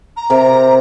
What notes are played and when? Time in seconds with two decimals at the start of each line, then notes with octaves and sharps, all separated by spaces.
0.16 A#5
0.30 C3 G4 A#4